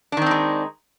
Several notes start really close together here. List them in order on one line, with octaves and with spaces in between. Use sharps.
D4 D#3 C4 D#4 G#3